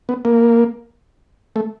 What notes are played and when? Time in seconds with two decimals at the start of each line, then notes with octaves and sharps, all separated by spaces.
0.09 B3
0.25 A#3
1.56 A3